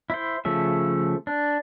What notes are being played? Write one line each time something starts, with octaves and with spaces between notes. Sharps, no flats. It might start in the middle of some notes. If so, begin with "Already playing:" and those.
E4 C5
C#3 F3 A3 E5
D4